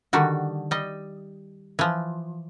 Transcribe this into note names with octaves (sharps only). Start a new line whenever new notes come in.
D3 D#3 G3 F#4
G3 D#5
E3 F3